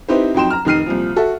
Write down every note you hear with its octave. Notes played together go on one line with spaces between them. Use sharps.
C4 D#4 E4 G4 B4 C5
F2 F#3 D#4 G5 C6 E7
A#5 F6
F1 D#3 D#4 F6 C7 D#7
C2 A#2 F3
F#4 A4 E5